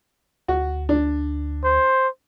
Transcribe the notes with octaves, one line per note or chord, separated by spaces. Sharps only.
D2 F#4
D4
C5